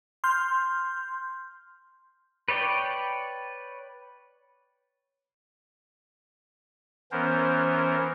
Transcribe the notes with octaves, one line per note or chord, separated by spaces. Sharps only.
C6 F6 G6
B4 C#5 D5 G5
E3 B3 C#4 A#4 C5